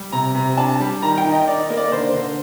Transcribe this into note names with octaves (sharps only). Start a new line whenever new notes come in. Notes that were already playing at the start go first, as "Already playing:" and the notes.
Already playing: G3
C3 A#5
C3
D4 A5
G3
D#3 A#5
G5
D#3
D#5
D#4 D5
A#3
D5
D3 C5
D3